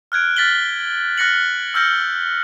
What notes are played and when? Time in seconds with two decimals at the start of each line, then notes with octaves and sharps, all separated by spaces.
0.12 F6 F#6 G#6 D7
0.36 F6 A6 B6 F#7 G7
1.17 F6 F#6 A#6 C#7 F#7
1.74 E6 F6 G6 A#6 C#7